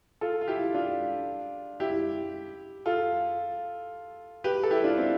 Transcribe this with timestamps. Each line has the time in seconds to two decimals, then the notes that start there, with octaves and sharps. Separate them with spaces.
0.21 F4 A4
0.41 F4
0.48 E4 G4
0.74 D4 F4
1.80 E4 G4
2.86 F4 A4
4.44 G4 B4
4.63 A4
4.71 E4 G4
4.84 D4 F4
4.97 C4 E4